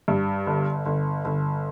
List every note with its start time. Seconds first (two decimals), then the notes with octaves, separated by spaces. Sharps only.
0.08 G2
0.47 G1
0.86 G1
1.25 G1